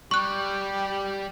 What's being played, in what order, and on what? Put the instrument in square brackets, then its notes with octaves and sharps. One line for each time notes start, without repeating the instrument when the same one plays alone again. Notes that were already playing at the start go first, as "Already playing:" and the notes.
[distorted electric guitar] G3 [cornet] G4 [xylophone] C#6 F#6